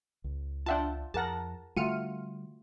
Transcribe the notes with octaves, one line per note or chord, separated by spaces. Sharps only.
C#2
D4 F4 E5 F#5 G5 A5
F2 G#4 A#4 F#5 A5 A#6
D3 G3 A3 F4 F#4 F6 C#7 D#7